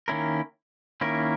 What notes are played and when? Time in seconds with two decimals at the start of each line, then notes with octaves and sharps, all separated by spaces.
0.08 D#3 A#3 C#4 E4 A#4
1.01 D#3 A#3 C#4 E4 A#4